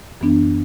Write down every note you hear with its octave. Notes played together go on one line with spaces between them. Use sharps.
F#2 E3 B3 D4